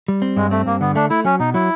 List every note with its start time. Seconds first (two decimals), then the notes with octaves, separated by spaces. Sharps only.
0.08 G3
0.22 C4
0.36 G2 G#3
0.51 A3 C4
0.66 G2 A#3
0.81 D3 B3
0.95 A3 D4
1.10 A3 E4
1.25 F#3 C#4
1.40 B2 D#4
1.54 F#3 E4